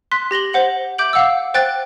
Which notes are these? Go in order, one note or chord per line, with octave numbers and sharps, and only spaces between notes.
C6 F#6 B6
G4 A#6 F#7 G7
C5 F#5 F#7
E5 D6 G6 D7 F#7
F5 F#5 D6 E6
C5 G5 F#6 A6